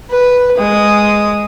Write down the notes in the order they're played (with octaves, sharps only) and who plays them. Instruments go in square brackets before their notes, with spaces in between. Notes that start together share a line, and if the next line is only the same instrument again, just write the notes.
[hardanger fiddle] B4
G#3 D#6